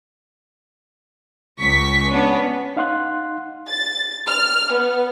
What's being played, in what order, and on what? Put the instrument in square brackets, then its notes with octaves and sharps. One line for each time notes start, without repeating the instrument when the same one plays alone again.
[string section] C#2 C#6 B6
B3 C#4 D4
[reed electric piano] D#4 F5 F#5 C6 F#6
[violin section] A6
F6
B3